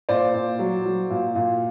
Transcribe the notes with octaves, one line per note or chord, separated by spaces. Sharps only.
A#2 C5 D5
A#2
F#3
F#3
A#2
A#2